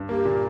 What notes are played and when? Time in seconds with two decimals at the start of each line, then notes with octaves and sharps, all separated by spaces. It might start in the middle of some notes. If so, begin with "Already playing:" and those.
Already playing: G2
0.09 A#3 G4
0.25 A#2